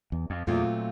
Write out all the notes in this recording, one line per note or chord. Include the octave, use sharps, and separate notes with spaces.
E2
F2
E2 A#2 F#3 A3 C4 F4